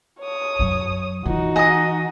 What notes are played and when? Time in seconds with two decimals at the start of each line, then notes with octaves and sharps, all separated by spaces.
0.20 C#5 D#6
0.59 F#2 F#3
1.26 E3 D#4 F4 F#4
1.56 D#5 G#5 D#6